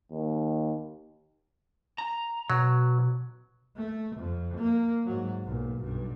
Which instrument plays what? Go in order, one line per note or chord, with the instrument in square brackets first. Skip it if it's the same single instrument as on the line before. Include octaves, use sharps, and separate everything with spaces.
[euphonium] D#2
[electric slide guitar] A#5
[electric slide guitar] B2 [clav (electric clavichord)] F#3
[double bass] A3
F2
A#3
G#2 F#3
B1 A#2
B1 G2